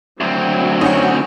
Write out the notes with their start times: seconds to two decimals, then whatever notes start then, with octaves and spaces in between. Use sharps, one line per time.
0.21 D2 F#3 C4
0.81 C#4 D#4 F#5